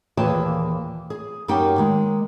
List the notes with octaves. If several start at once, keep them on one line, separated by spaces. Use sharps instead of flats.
D#2 A#2 E3 G#4 G5 A5
G#4
F#2 A#3 D#4 G4 F#5 G5
D#3 G#3